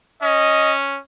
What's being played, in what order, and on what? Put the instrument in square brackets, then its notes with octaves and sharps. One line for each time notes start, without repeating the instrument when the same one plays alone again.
[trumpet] C#4 [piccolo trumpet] D#5